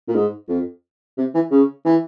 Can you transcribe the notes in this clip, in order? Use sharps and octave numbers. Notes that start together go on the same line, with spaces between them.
A#2
G#2
F2
C3
E3
C#3
E3